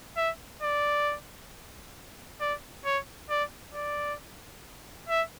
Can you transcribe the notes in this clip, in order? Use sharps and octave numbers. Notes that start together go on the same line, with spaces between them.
E5
D5
D5
C#5
D5
D5
E5